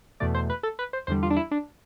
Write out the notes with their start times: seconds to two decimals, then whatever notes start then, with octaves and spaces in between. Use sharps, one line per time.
0.20 E2 B2 A3 D5
0.35 C5
0.50 B4
0.63 A4
0.79 B4
0.93 C5
1.07 E2 D3 G3 C5
1.23 F4
1.30 D4
1.36 E4
1.51 D4